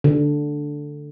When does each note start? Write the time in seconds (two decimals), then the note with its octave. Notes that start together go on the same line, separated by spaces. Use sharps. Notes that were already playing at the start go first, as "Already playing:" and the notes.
0.04 D3